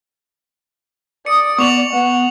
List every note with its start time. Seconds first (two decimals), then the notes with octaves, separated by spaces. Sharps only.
1.26 D5 D#6 C#7
1.59 B3 C#6 F7 F#7
1.93 B3 F#5